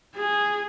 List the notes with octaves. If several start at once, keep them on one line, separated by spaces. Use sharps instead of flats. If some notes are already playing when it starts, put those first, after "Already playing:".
G#4